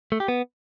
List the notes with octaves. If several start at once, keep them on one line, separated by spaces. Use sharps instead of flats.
A3
G4
B3